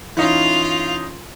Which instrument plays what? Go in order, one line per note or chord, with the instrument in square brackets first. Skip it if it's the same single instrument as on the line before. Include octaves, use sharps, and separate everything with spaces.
[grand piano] E3 C#4 D#4 [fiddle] F4 F5